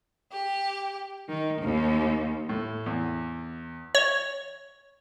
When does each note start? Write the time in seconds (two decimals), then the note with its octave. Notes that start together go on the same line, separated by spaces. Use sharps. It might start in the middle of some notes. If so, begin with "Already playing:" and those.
0.32 G4
1.28 D#3
1.60 D#2
2.49 A2
2.86 E2
3.95 C#5